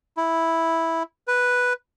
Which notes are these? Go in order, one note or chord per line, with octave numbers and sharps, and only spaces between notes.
E4
B4